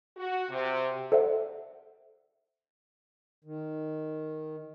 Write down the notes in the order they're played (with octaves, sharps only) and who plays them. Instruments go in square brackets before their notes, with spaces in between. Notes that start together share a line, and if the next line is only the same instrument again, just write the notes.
[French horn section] F#4
C3
[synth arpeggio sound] A4 C5 D5 E5 F#5
[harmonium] D#3